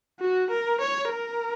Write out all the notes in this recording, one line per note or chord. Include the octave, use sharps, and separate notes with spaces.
F#4
A#4
C#5
A#4